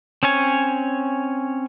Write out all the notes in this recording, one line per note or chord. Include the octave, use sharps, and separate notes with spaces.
C4 C#4 C#5 G#5